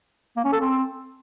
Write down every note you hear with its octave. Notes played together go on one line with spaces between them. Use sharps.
A#3
C#4
A4
C4